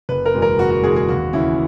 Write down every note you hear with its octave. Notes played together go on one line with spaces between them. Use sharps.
F#1 B4
A#4
E2 B2 G#3
A#4
F#1 F#4
F#4
E2 B2 G#3 G#4
G#4
D#2 F#4
C#3 E3 E4